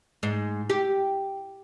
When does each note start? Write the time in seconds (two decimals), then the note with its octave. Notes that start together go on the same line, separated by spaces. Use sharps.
0.23 G#2
0.70 G4